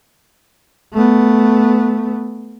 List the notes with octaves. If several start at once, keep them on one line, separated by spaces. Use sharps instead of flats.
A3 B3